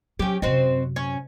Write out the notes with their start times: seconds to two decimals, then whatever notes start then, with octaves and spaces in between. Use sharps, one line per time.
0.19 F#3 C#4 G4
0.42 F#2 C3 C4 F#4 D#5
0.96 C#4